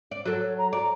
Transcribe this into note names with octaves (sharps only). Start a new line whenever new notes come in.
D5
F#3 A4
C#5
A#5
D5 A#5